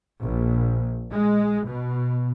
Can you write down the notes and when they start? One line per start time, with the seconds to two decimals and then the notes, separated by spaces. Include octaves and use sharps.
0.22 A#1
1.12 G#3
1.68 B2